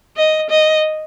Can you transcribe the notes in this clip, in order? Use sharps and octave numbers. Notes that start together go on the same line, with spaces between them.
D#5
D#5